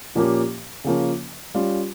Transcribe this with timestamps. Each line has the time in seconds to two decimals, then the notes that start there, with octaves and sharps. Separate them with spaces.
0.15 A#2 F3 A#3 C#4 G4
0.84 C#3 F3 A#3 C#4
1.54 G3 C#4 F4